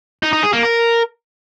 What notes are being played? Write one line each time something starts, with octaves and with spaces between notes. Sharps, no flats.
D#4
D#4
G#4
A#3
A#4